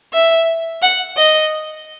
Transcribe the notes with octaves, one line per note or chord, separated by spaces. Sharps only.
E5
F#5
D#5